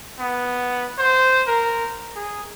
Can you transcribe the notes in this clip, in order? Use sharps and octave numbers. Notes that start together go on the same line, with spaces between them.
B3
C5
A#4
G#4